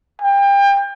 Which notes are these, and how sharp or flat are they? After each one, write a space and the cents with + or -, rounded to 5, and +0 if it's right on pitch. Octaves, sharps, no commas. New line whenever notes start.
G5 +30